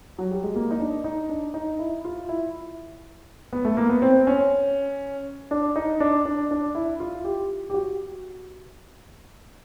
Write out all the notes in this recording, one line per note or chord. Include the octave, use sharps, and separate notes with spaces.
F#3
G3
G#3
A#3
D#4
D4
D#4
D4
D#4
E4
F4
E4
B3
A3
A#3
B3
C4
C#4
D4
D#4
D4
D4
D4
E4
F4
G4
G4
F#4